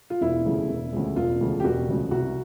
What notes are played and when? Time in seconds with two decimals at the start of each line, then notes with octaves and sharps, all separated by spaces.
0.10 F4
0.21 E1 E4
0.45 D2 C#3 F3 G#3
0.69 E1
0.93 D2 C#3 F3 G#3
1.16 E1 F4
1.41 D2 C#3 F3 G#3
1.60 G4
1.64 E1 F#4
1.88 D2 C#3 F3 G#3
2.11 C2 F#4